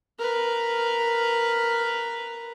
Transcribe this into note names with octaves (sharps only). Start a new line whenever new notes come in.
A#4 B4